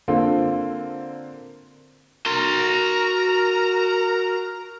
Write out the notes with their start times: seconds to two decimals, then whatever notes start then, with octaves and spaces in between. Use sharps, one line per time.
0.08 D3 A#3 C4 F4 A4
2.26 F#4 A#4 C6